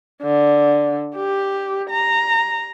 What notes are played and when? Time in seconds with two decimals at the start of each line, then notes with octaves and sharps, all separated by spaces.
0.22 D3
1.16 G4
1.90 A#5